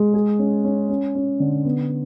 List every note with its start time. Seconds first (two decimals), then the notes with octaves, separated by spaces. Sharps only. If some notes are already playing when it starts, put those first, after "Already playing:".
Already playing: G#3
0.14 G#4
0.39 C#4
0.65 C#4
0.89 C#4
1.15 C#4
1.40 D3
1.65 B3